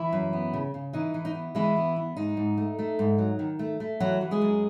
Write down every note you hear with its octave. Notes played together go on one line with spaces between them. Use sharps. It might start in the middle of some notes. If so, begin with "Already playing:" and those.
Already playing: E3 E4
F#2
B3
C#3
C#3
E3 D#4
E3
D#4
B3
E3 G#3 E4
B3
B3
G#2 D#4
G#2
A3
A3
G#2
F#3
D#3
A3
A3
E3 F#3 F#4
E3
G#3 G#4
F#2